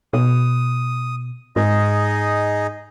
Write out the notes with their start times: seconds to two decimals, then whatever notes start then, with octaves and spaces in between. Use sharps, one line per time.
0.13 B2 D#6
1.56 G#2 D#4 G#4 D#5